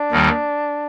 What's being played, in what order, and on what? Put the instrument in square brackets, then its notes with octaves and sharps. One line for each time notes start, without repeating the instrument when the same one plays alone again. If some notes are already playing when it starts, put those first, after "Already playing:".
Already playing: [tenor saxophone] D4
[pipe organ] D#2 D#3 G3